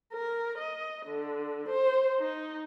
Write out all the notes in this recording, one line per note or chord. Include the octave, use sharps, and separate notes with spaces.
A#4
D#5
D3
C5
D#4